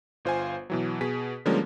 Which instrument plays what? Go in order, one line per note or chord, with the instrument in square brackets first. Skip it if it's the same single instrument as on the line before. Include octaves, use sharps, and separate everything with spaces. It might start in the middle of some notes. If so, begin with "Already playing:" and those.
[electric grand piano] G1 F4 C5 F5 G#5
B2 E3 F#3
B2 G#4 B6
D3 F3 G3 G#3 A#3 C#4